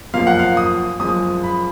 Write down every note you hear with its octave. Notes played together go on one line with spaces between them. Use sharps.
F#2 F3 A#3 F5
F#5
F5
D#6
F#2 F3 G#3 D#6
B5